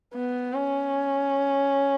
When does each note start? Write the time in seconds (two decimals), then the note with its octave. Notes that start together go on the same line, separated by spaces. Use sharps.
0.14 B3
0.54 C#4